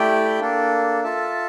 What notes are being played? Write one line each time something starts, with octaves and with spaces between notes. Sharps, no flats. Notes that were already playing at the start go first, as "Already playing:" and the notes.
Already playing: A3 E4 G4 D5 G5
A#3 D4 A4
F4 A4 E5 A5